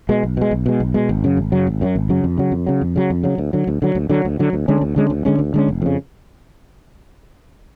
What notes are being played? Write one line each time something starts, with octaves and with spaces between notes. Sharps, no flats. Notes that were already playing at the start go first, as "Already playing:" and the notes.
B2 G#3
B1
B2 G#3
B1
B2 G#3
B1
B2 G#3
G#1
F#2 C#3 F#3
G#1
F#2 C#3 F#3
G#1
F#2 C#3 F#3
G#1
F#2 C#3 F#3
F2
C#3 F#3
F2
C#3 F#3
F2
C#3 F#3
F2
C#3 F#3
D2
D3 F#3
D2
D3 F#3
D2
D3 F#3
D2
D3 F#3
D2
D3 G#3 C#4
D2
D3 G#3 C#4
D2
D3 G#3 C#4
D2
D3 G#3 C#4
F1
F2 C#3